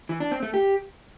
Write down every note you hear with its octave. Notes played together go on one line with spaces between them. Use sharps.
E3
D4
C4
A3
G4